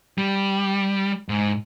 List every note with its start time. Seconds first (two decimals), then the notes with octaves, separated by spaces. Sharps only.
0.18 G3
1.29 G#2